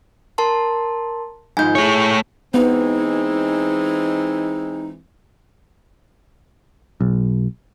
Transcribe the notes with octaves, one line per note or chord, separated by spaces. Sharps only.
A#4 A5 C6
G#1 G#2 F3 G#5 G6
A3 E4 G#4 C#5
E3 G#3 B3 C4 D#4
B1